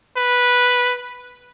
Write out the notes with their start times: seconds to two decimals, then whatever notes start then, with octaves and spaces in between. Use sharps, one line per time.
0.16 B4